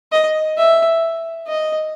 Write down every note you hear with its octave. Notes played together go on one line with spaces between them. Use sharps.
D#5
E5
D#5